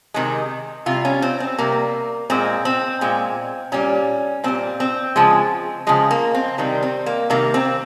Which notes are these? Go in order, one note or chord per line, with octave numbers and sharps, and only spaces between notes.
C3 D#3 G#3
C3 G3 F4
C#4
C4
C4
C3 G3 A#3
A#2 G#3 C4
C4
A#2 G#3
A#2 G3 C#4
A#2 G3 C4
C4
C#3 F3 G#3
C#3 F3 G#3
A#3
C4
C3 D#3 G3 C4
C4
A#3
C3 D#3 G3 A#3
C4